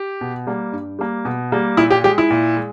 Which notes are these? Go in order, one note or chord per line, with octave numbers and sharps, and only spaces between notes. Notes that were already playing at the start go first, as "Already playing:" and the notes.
Already playing: G4
B2
G3 A#3
G2
G3 A#3
B2
G3 A#3
A#2 E4
G4
G#3 G4
E4
A#2
G#3